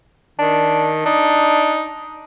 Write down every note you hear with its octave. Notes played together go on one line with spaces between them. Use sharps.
D#3 D4
D4 D#4